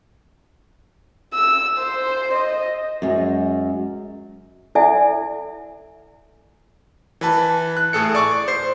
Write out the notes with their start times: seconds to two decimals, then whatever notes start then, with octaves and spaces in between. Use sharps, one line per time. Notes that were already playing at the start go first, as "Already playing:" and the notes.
1.34 E6
1.78 C5
2.34 D#5
3.02 F#2 G#3
4.75 E4 A4 D5 E5 F#5 G#5
7.21 E3 B4 A5
7.77 F#6
7.93 A2 G#4 A4 C#7
8.15 D5 C#6 D6
8.48 C5 C7